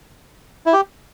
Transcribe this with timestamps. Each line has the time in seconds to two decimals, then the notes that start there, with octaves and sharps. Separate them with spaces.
0.66 E4
0.73 G4